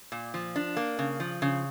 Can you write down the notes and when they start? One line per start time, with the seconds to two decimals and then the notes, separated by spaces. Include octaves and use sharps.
0.12 A#2
0.34 F3
0.56 D4
0.77 A#3
0.99 C#3
1.20 F3
1.42 C#3